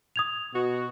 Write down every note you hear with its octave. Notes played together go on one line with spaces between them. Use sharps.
D#6 G#6 F7
B2 F#4